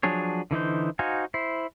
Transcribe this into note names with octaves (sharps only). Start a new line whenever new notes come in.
F3 F#3 D4 G#4 C#5
D3 E3 D#4 C5
D#4 F#4 C5 F5 G#5
E4 C5